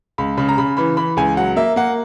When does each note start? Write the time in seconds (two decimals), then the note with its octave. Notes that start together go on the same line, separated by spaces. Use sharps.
0.18 C#2 B5
0.38 C#3 B5
0.49 A#5
0.58 C#3 B5
0.77 E3 B5
0.97 E3 B5
1.17 C#2 G#5
1.37 F#3 F#5
1.56 A#3 E5
1.76 A#3 F#5